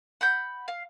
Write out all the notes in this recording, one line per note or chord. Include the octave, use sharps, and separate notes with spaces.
F#5 B5 G6
F5